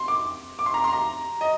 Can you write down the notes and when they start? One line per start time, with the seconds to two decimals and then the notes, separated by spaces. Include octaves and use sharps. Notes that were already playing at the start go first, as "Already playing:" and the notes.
Already playing: C6
0.08 D6
0.59 D6
0.66 C6
0.74 A#5
0.84 C6
0.93 A#5
1.41 D#5